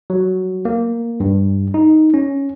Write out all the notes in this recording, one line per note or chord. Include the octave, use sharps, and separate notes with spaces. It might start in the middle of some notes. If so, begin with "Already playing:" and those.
F#3
A#3
G2
D#4
C#4